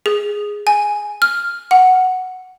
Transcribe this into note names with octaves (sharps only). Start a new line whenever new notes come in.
G#4
G#5
F6
F#5